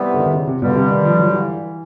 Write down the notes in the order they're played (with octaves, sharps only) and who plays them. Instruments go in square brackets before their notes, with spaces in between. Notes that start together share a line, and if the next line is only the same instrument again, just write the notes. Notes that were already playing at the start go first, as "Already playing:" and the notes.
Already playing: [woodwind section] C3 E3 G3 B3
[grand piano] D3
D#3
C#3
C3
[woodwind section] G2 D3 G3 [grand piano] B2
[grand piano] C3
D#3
F3
F#3
E3